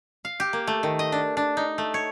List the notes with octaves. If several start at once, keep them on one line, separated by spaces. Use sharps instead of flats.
F5
G4
A#3
A3
D#3
D#5
D4
D4
D#4
A3
C#5